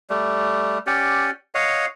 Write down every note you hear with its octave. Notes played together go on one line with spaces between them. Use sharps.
G3 A3
C#4 G4 D5 F#5
C#5 D#5 F5 F#5